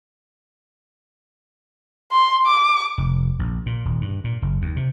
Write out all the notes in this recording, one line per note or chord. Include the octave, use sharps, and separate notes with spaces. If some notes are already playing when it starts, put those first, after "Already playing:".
C6
D6
F1
A#1
A#2
D#1
G2
A#2
F#1
D#2
C3